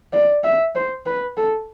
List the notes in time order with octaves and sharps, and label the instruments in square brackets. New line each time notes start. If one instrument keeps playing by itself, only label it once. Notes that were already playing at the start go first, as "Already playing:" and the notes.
[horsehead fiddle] D5
E5
C5
B4
A4